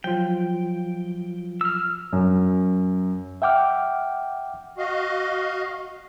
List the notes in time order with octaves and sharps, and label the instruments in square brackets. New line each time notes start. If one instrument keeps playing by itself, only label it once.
[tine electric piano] F3 F#3 F4 [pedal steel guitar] G5
[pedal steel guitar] E6 F6
[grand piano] F#2
[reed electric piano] E5 F#5 G5 D6 F6
[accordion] F#4 D#5 F5